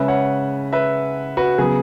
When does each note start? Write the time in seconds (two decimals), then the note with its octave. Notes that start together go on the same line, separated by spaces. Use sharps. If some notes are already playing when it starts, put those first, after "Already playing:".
Already playing: C#3 G#3 C#4 B4 E5
0.08 C#5 F#5
0.73 B4 E5
1.37 F#4 B4
1.58 C#3 F#3 B3 G#4